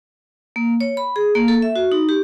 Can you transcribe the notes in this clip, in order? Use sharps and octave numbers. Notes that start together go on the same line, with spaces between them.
A#3
C#5
B5
G#4
A#3
A4
E5
F#4
D#4
G4